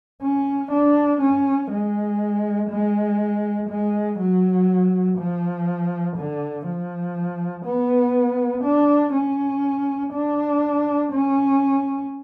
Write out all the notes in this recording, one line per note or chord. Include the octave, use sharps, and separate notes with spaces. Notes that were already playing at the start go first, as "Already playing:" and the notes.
C#4
D4
C#4
G#3
G#3
G#3
F#3
F3
D3
F3
B3
D4
C#4
D4
C#4